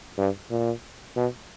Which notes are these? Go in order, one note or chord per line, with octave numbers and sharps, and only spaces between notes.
G2
A#2
B2